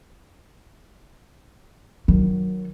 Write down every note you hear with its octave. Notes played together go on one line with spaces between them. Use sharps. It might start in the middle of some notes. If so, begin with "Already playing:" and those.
D#3 F#3